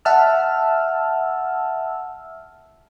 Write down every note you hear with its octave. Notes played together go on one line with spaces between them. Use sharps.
E5 F#5 A5 E6 F6